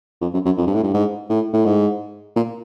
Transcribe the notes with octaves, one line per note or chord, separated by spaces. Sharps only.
F2
F#2
F#2
F2
G2
A2
G2
G#2
A2
A2
G#2
A#2